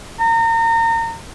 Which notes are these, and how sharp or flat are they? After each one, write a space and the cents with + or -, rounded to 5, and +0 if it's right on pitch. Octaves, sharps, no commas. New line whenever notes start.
A#5 -30